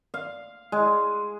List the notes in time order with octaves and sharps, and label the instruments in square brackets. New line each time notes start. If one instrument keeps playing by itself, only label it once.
[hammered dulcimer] F5
G#3